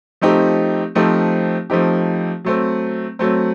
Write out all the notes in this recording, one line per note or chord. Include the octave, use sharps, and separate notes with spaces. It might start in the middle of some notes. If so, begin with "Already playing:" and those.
F3 A3 C4 D#4 G4
F3 A3 C4 D#4 G4
F3 A3 C4 D#4 G4
F#3 A3 C4
F#3 A3 C4